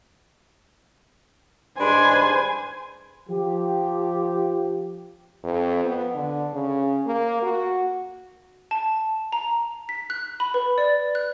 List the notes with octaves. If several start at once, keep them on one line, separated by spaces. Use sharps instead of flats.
G2 G#3 D4 C5 G#5 B5
F3 G4
F2
B3
D3
C#3
A#3
F#4
A5
A#5
B6
F#6
B5
B4
D5
F#6